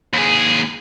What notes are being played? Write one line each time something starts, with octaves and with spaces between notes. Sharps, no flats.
D#2 G#4